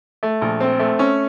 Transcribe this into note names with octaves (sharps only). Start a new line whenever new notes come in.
A3
A#1
C4
A3
C#4